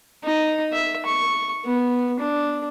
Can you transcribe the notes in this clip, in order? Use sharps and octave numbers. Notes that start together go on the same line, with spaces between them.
D#4
E5
C#6
B3
D4